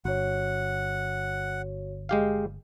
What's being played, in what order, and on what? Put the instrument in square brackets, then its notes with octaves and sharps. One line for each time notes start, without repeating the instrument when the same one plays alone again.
[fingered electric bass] G1 [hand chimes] F#4 C#5 [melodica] F#5
[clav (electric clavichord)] G#3 G4 F5